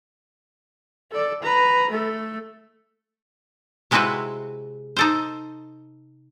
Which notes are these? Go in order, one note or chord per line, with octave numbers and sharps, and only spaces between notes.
A4 D5
B4 A#5
A3 A4
C3 G#3 C4 E4 F#4 B4
D#4 A4 C5